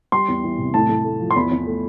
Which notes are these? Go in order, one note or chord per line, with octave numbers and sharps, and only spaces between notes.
G3 C6
E2
E3
C3
A2 A5
A2
A3
F3
C6
E2 B5
E2
A3